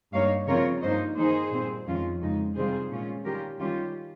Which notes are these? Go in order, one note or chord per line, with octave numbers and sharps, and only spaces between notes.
G2 G3 A#3 D#4 C#5 F5
C#3 F3 C4 F4 A#4 C#5
G2 F3 A#3 D#4 C5 D#5
D#3 A#3 D#4 G#4 C5
A#2 G3 C4
F2 D#3 G#3 C#4 F4
F2 C#3 G#3 D#4
C3 D#3 G3 C4 F4 G#4 C5
A#2 G#3 C#4 F4
D#3 G3 C#4 F4 G4 A#4
D#3 G3 C#4 F4 G4